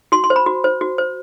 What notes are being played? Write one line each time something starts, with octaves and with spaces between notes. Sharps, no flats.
F#4 C6
C6
C5
B5
F#4
C5
F#4
C5